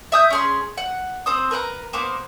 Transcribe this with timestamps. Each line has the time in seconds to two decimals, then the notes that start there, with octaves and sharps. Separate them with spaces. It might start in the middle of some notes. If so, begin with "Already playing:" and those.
0.12 E5 D#6 G6
0.30 C#4 G#4 C6
0.77 F#5
1.26 C4 C5 D#6
1.51 A#4 B4 G5 A#5
1.93 A#3 B3 C5